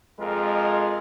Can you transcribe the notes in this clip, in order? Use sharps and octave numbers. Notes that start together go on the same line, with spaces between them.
F2 G#3 F4 A#4